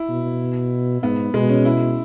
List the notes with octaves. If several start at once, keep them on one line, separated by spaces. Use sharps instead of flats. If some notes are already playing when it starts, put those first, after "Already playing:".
Already playing: E4
B2
G#2 B3
B2 G#3
C#4
E4